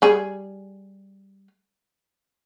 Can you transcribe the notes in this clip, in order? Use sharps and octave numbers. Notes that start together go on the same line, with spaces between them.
G3 G#4